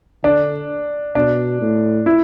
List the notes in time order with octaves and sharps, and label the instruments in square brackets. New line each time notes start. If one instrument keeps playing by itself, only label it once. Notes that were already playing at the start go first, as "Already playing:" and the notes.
[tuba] D3 [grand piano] D4
[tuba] B2 [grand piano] D4
[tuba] A2
[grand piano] E4